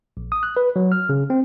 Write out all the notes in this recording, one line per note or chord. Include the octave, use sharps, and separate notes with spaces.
A#1
D#6
F#6
B4
F#3
F6
C#3
C4